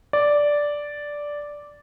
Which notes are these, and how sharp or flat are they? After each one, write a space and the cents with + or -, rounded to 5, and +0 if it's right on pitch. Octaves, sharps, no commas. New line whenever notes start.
D5 -5